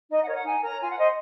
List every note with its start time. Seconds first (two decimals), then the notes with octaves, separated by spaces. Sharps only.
0.09 D#4 D#5
0.22 F#5
0.28 A#4 C#5
0.34 F#5
0.45 D#4 G#5
0.62 A#4 C#5 A#5
0.80 F4 G#5
0.89 F#5
0.97 C5 D#5